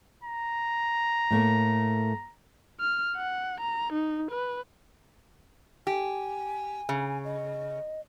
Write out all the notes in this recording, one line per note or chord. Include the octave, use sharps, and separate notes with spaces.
A#5
A2 A3 A#3
F6
F#5
A#5
D#4
B4
G4 G#5
C#3
D#5